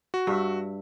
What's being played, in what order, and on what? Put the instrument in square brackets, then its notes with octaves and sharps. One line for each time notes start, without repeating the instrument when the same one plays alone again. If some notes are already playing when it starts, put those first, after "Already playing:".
[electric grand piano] F#4
[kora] G2 E5